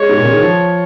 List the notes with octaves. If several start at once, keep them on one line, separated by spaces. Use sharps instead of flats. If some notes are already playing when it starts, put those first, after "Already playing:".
Already playing: G#3 C#5
G#2
A#2
C#3
D#3
F3